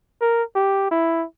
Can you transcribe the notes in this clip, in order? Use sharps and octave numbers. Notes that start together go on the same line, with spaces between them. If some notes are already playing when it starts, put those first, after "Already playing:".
A#4
G4
E4